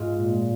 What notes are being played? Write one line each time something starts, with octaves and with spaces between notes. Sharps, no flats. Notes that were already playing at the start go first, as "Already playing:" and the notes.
Already playing: G#2 G#3 F4
A#2